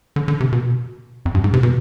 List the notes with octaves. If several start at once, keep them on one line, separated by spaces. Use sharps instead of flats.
D3
D3
C3
B2
F2
G2
G#2
C3
B2